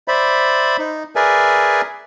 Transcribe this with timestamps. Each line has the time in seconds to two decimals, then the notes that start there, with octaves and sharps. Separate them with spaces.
0.08 C5 D5 E5 B5
0.79 D#4
1.16 G#4 A#4 B4 D5 E5 G#5